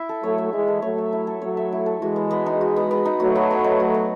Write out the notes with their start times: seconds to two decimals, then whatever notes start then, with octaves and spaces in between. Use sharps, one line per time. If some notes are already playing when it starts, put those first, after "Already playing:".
Already playing: E4 E5
0.09 A4
0.23 F#3 A3 C#5
0.38 E5
0.53 E3 G#3 E4
0.68 A4
0.82 F#3 A3 C#5
0.98 E5
1.13 E4
1.27 A4
1.42 F#3 A3 C#5
1.57 E5
1.72 E4
1.86 A4
2.02 E3 G#3 F#4
2.16 B3
2.31 B3
2.46 D#4
2.61 F#4
2.76 B3
2.91 B3
3.05 D#4
3.20 F#3 A3 F#4
3.35 B3
3.51 B3
3.64 D#4
3.80 F#4
3.94 B3